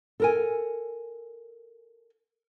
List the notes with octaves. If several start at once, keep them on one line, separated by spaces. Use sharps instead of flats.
A4 A#4 G#5